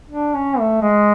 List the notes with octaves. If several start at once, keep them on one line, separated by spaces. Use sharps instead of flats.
D4
C#4
A3
G#3